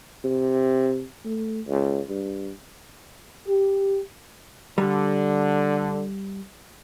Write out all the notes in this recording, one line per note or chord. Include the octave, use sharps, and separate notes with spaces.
C3
A3
C#2
G2
G4
D3 G3